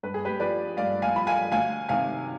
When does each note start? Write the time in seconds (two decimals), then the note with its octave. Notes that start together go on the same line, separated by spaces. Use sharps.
0.03 G2 B4
0.14 G#4
0.25 G4 B4
0.40 F3 B4 D5
0.77 G2 D5 F5
1.02 F5 G#5
1.15 F3 B5
1.27 F5 G#5
1.52 D2 F5 G#5
1.88 C3 D#3 F5 G#5